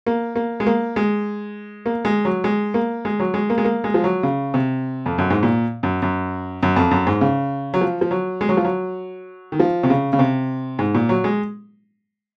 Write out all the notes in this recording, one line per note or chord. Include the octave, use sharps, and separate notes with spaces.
A#3
A#3
G#3
A#3
G#3
A#3
G#3
F#3
G#3
A#3
G#3
F#3
G#3
A#3
G#3
A#3
G#3
F3
F#3
C#3
C3
F2
F#2
G#2
A#2
F#2
F#2
F#2
F2
F#2
G#2
C#3
F#3
F3
F3
F#3
G#3
F#3
F3
F#3
D#3
F3
C3
C#3
C#3
C3
G#2
A#2
F#3
G#3